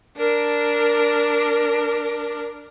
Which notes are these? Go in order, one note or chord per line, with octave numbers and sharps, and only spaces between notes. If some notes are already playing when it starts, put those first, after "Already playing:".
D4 A#4